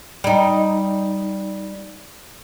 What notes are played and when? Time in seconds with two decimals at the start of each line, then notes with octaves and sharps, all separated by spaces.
0.24 G3 D#4